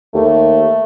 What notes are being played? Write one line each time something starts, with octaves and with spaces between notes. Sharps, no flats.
D#2 A3